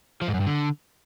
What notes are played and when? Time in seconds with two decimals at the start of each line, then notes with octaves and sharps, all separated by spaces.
0.21 F3
0.28 G#2
0.34 F#2
0.40 G2
0.47 D3